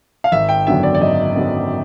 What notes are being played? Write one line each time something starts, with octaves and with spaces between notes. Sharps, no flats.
F5
G#1 E5
G5
F#2 D3 F#3 B3 E5
D5
D5
G#1 D#5
F#2 D3 F#3 B3